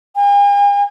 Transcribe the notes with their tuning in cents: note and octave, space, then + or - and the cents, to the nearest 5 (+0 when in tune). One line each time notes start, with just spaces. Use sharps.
G#5 -45